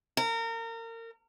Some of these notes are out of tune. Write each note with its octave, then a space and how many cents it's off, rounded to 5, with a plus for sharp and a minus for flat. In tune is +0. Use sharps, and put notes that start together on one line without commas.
A#4 -30